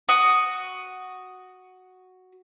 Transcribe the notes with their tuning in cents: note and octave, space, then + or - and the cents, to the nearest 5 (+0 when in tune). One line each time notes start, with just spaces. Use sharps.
F#4 +0 D#6 +0